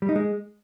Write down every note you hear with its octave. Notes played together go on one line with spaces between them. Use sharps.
G3
D#4
G#3